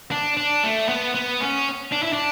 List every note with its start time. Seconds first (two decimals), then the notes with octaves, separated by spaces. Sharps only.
0.11 D4
0.37 D4
0.63 A3
0.89 B3
1.14 B3
1.41 C#4
1.92 D4
2.03 E4
2.13 D4